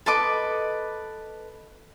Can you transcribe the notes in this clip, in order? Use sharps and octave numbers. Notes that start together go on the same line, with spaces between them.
A4 B4 D#5 D6